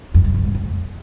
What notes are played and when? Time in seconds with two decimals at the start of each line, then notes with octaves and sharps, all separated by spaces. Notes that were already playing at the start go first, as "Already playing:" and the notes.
0.14 F2
0.24 F#2
0.35 C#3
0.45 G#2
0.55 F2